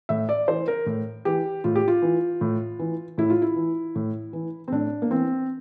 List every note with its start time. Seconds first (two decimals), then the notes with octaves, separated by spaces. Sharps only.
0.09 A2 E5
0.29 D5
0.48 E3 C5
0.68 A#4
0.86 A2
1.25 E3 G4
1.64 A2 F4
1.75 G4
1.88 F4
2.02 E3
2.41 A2
2.79 E3
3.18 A2 E4
3.30 F4
3.42 E4
3.56 E3
3.95 A2
4.33 E3
4.68 C4
4.72 A2 D4
5.02 A#3
5.11 E3 C4